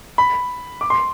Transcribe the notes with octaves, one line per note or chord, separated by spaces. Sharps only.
B5
D6
C6